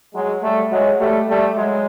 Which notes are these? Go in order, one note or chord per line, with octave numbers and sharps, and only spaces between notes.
F#3 G#3
G3 A3
F#3 G#3
G3 A3
G3 A3
F#3 G#3